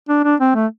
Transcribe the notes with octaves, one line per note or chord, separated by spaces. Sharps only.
D4
D4
C4
A3